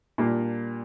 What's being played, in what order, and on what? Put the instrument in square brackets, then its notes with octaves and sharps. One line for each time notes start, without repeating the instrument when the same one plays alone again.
[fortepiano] A#2 G3 A#3 D4 F4